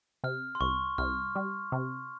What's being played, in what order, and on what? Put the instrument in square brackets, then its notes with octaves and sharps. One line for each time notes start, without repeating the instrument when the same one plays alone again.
[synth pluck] C3 [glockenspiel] F6
[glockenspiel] C6
[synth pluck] C2 [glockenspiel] C#6
[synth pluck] C2 [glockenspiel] F6
[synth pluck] G3
C3